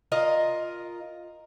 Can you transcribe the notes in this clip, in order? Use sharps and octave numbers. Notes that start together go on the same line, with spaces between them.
F4 A#4 D#5